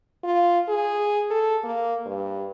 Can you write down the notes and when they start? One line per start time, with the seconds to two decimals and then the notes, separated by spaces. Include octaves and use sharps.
0.24 F4
0.68 G#4
1.30 A4
1.64 A#3
2.06 G2